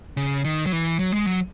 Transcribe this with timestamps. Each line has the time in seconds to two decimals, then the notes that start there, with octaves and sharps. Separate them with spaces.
0.17 C#3
0.45 D#3
0.66 F#3
0.72 E3
0.99 F#3
1.12 G#3
1.26 F#3